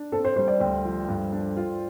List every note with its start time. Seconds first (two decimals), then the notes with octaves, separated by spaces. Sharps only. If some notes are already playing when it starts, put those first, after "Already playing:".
Already playing: D4
0.12 C4 A4
0.25 C5
0.36 G3 C5
0.48 D5
0.60 D2 G5
0.85 F3
1.08 G2
1.32 D4
1.57 F4